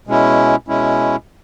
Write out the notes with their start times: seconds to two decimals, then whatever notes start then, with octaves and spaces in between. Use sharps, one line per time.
0.07 B2 G#3 C#4 E4
0.68 B2 G#3 C#4 E4